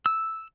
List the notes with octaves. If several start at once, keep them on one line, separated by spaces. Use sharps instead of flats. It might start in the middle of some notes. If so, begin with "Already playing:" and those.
E6